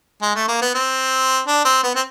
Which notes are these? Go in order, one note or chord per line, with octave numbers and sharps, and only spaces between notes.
G#3
A3
A#3
B3
C4
D4
C4
B3
C4